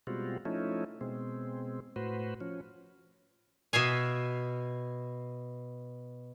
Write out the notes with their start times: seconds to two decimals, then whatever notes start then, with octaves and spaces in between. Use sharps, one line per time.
0.07 B2 G3 G#3 C4 F4 F#4
0.45 F3 A3 C#4 D#4 E4
1.01 B2 G#3 C4
1.96 A2 F#4 B4 C5
2.41 F3 C#4
3.73 B2 E5 F5 G#5